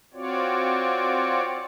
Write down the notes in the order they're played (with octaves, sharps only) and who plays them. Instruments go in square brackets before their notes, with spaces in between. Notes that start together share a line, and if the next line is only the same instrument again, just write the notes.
[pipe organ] C4 F4 F#4 C#5 D5